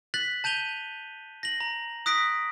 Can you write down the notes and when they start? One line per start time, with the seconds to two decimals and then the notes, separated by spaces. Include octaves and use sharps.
0.14 F#6 A6 B6 F#7
0.44 A5 G6 D#7 F7 G7
1.43 A#6 F#7
1.60 A#5
2.06 D#6 F#6 A#6 B6 D7